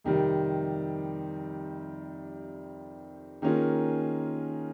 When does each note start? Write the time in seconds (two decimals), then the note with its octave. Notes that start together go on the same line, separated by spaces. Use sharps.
0.04 F2 C3 D#3 G3
3.42 D#3 A#3 C#4 F4 G#4